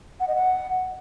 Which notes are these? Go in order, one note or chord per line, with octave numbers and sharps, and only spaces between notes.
F#5
D#5
F#5